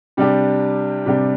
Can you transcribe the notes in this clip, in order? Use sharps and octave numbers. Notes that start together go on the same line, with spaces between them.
C3 G3 D4 G4
C3 G3 D4 G4